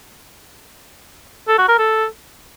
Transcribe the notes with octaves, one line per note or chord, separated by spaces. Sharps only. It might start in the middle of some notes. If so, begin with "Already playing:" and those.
A4
F#4
A#4
A4